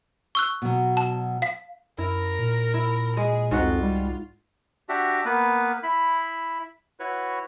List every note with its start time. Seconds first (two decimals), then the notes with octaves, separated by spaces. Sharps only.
0.35 C#6 E6 F#6
0.62 B2 F#3
0.97 A5
1.42 F5 B6
1.98 F#2 E4 A#4
2.39 A#2
2.74 E4
3.17 G#3 G#4
3.51 C2 F2 G#2 F4 F#4 F#5
3.81 G3
4.89 D4 F#4 G4 E5
5.26 A#3 B3 B4
5.83 E4 B5
7.00 E4 F#4 B4 C#5